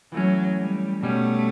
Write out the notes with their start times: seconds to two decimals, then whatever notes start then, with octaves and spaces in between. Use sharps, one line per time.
0.12 E3 F#3 A3 C#4
0.58 G3
1.03 B2 G3 A3 C#4